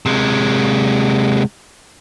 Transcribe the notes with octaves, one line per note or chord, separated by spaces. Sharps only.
C3 G#3